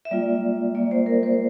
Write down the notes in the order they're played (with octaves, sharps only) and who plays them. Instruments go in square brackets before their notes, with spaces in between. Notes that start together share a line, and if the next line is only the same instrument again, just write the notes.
[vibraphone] E5
G3 A#3 F4 D5
G3 A#3 F4 D5
C5
A#4
C5